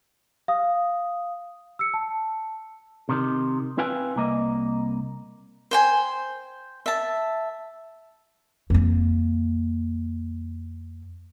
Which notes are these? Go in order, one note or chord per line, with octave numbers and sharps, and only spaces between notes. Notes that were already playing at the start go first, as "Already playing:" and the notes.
F5 D#6
E6 C#7
A5
C3 D#3
C4 E4 B4 F5 G5 G#5
C2 A#3 D#5
C5 G5 G#5
E5 A5
F2 A#3